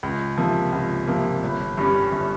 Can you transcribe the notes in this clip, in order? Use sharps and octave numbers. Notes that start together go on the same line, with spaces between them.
C#2
C3 F3 A#3
C#2
C3 F3 A#3
G1
G2 G3 C#4
G1